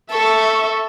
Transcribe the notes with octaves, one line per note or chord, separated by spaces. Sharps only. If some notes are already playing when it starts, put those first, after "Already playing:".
A4 E5 C#6